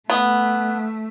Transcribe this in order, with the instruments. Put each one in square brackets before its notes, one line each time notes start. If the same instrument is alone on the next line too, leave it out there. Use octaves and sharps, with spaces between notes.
[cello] A3 [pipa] B3